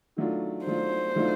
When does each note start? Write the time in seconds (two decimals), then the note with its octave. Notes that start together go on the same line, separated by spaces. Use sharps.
0.17 D#3 F#3 A3 D4 F4
0.66 D#3 F#3 A3 D4 F4 C5
1.15 D#3 F#3 A3 D4 F4